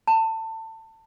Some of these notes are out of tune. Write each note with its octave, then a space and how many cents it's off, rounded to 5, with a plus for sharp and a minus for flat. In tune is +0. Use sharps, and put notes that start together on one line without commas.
A5 +25